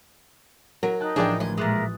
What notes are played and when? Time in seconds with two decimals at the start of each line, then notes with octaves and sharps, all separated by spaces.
0.83 F#3 A#4
1.00 D#4 G5 A5 F#6
1.16 A1 F3 D4 G#4 A#4 D5 G5
1.40 D2 D#5 G#6
1.57 A#2 G#3 A#4 E5 D6 D#6 F#6 A6